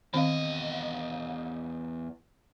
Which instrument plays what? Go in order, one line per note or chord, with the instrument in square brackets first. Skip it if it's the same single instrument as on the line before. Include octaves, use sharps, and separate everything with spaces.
[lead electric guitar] E2 D#5 [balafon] D#3 C4 F5